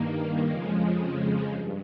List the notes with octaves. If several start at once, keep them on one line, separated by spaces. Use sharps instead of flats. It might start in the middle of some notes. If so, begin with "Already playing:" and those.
Already playing: G2 D#3 A#3
F2 C#3 F3 G#3
G2